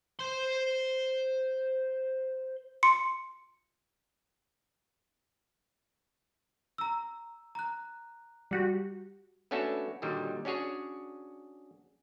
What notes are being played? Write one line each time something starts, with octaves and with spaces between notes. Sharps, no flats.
C5 C6
C6 C#7
A#5 E6
A#5 F#6
G3 F#4 G4
A3 B3 C#4 D4 F#4 A4
A#2 D3 D#3 F#3 G3
C#4 D4 F#4 G#4 C#5